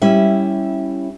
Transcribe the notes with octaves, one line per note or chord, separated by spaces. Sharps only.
G3 C#4 E4 E5